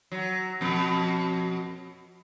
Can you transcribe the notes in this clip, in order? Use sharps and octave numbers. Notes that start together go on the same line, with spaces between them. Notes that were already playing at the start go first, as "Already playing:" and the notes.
F#3
F2 B2